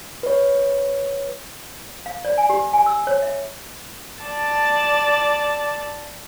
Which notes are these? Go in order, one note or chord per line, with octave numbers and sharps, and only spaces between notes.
B4 C#5
F5
D5
G#5
G4
G#5
E6
C#5
E5
D5 A5